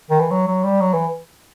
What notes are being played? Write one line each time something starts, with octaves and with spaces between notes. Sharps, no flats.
D#3
E3
F#3
F#3
G3
F#3
E3